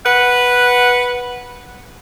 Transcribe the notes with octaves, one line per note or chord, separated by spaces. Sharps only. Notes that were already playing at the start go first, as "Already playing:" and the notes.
B4 F#5